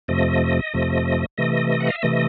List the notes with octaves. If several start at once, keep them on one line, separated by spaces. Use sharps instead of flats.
F2 C3 F3 A3 D#5
F2 C3 F3 A3
C3 E3 A3 D#5
F#5
F5
E5
C3 E3 A3 D#5